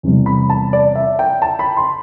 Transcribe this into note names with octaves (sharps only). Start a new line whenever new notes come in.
E2 C3 G3
B5
A5
D5
E5
G5
A5
B5
C6